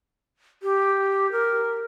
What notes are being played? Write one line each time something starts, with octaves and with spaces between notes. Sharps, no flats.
G4
A#4